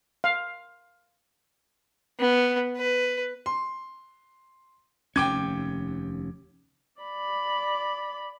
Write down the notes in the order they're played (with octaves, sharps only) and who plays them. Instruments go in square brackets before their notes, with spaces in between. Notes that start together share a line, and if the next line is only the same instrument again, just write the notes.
[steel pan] F5
[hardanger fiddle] B3
B4
[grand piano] C6
[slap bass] F1 D#2 C#4 [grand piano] G5 D6 G#6
[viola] D5 B5